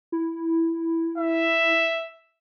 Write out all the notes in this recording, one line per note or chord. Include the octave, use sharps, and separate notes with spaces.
E4
E5